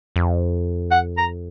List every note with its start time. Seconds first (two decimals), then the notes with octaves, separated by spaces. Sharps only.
0.16 F2
0.91 F#5
1.18 A#5